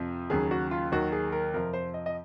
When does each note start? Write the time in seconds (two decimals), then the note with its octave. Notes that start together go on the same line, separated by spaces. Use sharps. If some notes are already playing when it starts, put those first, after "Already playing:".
Already playing: F2 C3 F3
0.30 D#2 C#3 F#3 G#4
0.51 F#4
0.71 F4
0.92 D#2 D#3 F#3 F#4
1.12 G#4
1.32 A#4
1.54 F2 C3 F3 A#4
1.73 C5
1.94 D#5
2.06 D#5